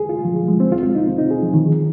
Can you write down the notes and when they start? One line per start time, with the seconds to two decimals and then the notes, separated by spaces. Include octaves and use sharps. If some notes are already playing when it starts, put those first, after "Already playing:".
Already playing: G#4
0.09 F4
0.25 F3
0.36 F3
0.48 G#3
0.60 C4
0.72 F4
0.83 F4
0.95 D#4
1.07 C4
1.19 D#4
1.31 G#4
1.42 F3
1.54 D#3